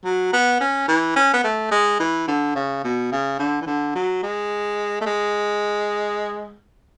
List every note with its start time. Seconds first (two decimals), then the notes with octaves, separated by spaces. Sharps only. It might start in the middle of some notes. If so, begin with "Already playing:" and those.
0.04 F#3
0.33 B3
0.60 C#4
0.88 E3
1.16 C#4
1.33 B3
1.44 A3
1.71 G#3
2.00 E3
2.27 D3
2.55 C#3
2.84 B2
3.12 C#3
3.39 D3
3.61 E3
3.66 D3
3.95 F#3
4.23 G#3
5.01 A3
5.06 G#3